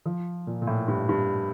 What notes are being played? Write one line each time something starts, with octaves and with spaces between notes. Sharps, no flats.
F3
A#2
A#2
A2
G2
G2